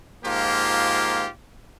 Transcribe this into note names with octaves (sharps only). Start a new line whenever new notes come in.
G#2 F3 A#3 F4 G4